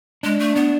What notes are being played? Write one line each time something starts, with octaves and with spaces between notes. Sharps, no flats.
G#3 D4
A3
B3 D4